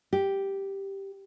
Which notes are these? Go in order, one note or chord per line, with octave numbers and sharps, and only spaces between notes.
G4